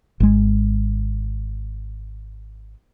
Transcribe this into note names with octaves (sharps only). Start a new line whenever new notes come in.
G#1 G#3